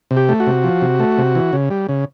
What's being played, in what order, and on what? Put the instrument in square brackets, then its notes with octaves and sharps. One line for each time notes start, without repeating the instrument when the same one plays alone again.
[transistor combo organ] C3
G4
A3
F#4
C3
F3
C3
A3
C3
E3
C#3
G3
C#3